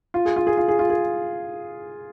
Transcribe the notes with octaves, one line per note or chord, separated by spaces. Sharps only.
F4
G#4
F4
G#4
F4
G#4
F4
G#4